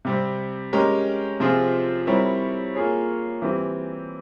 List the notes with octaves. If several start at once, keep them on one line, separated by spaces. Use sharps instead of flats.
C3 G3 C4
G#3 C#4 G4 A#4
C3 F3 C4 F4 G#4
G3 C4 E4 A#4 C#5
A#3 F4 G#4 C#5
E3 G3 C4 G4